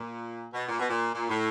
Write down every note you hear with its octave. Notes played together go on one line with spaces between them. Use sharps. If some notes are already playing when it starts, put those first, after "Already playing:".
Already playing: A#2
B2
A#2
B2
A#2
A#2
A2